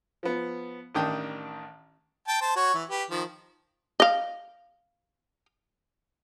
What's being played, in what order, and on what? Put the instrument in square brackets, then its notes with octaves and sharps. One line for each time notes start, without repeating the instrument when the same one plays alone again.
[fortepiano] F3 B3
A1 D#3 D4 G5 D#6
[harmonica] G5 A5
C5 A5
F#4 C#5
E3
G4 B4
D#3 F3
[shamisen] D#5 F5